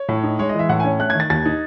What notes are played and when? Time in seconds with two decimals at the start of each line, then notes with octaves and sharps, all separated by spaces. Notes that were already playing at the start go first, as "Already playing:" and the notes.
Already playing: C#5
0.09 A2
0.23 D#4
0.39 G#3 C#5
0.49 D#5
0.54 E3 E5
0.69 A2 F#5
0.80 G#5
0.84 C#4
0.99 A3 F#6
1.10 G#6
1.15 D#3 A6
1.30 D#2 A6
1.46 D#4